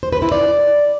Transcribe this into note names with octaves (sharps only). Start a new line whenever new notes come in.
C5
B4
E4
D5